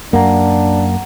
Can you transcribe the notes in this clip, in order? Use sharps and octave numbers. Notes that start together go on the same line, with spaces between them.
F#2 A#3 D4 F#5 A#5